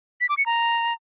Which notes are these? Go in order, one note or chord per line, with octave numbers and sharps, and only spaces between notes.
B6
D6
C#7
A#5